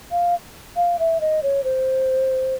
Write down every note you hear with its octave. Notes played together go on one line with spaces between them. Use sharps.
F5
F5
E5
D#5
C#5
C5